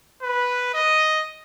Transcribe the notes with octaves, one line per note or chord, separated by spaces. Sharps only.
B4
D#5